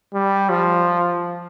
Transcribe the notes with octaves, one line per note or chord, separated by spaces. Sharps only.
G3
F3